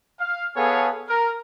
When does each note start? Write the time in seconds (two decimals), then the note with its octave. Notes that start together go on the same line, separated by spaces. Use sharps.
0.20 F5
0.57 B3 G#4 A4 C#5 F5 G#5
1.09 A#4